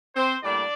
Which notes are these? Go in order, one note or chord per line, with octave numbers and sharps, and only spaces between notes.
C4 C5
A2 G3 A#3 D4 D5